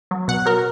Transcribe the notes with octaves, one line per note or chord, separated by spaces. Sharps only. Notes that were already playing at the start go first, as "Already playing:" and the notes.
F#3
B2 F#5
F#3 A#4